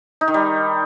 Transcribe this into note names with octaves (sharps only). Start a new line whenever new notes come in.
D#4
D#3
G3